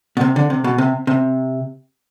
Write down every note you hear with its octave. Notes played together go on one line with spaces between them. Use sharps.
B2
C3
D3
C3
B2
C3
C3